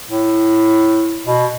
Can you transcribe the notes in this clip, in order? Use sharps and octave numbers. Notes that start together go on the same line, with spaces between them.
A2
B2